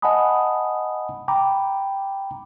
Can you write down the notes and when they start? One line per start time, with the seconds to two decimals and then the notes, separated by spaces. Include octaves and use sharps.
0.02 D#5 F#5 G#5 A5 B5 D#6
1.28 G5 A#5 B5 D6